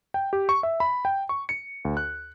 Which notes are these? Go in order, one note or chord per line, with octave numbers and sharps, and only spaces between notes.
G5
G4
C#6
E5
B5
G5
C#6
C#7
D2
F#6